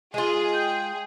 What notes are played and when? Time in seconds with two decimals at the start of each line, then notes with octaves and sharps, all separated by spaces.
0.14 G#3 F4 G#4
0.54 G5